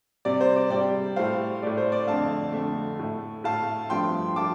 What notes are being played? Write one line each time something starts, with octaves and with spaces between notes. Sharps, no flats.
C3 G3 D5
C5
D5
C3 G3 D5 G5
A2 A3 C5 F5
A2 A3 D5
C5
D5
F2 D3 A3 F5 A5
F2 D3 A3
A2 A3
A2 A3 F5 A5
G2 F3 A3 G5 C6
F3 A3 A5 D6